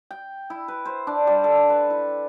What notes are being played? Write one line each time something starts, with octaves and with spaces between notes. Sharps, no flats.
G5
E4
B4
C5
D4
G3
A4
B4
E4